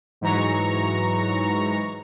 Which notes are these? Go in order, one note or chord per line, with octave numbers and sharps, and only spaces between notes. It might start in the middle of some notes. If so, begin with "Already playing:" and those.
G#2 E3 F#3 A#5 C#6